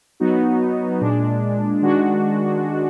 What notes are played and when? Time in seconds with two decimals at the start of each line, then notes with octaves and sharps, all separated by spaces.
0.20 F#3 B3 D#4 F#4
1.01 A#2 G#3 D4
1.82 D#3 G#3 D4 F#4